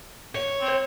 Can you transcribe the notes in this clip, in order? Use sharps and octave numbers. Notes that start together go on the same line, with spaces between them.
C#5
C4